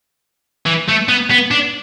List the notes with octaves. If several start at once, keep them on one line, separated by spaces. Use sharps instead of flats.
E3
A3
B3
B3
D4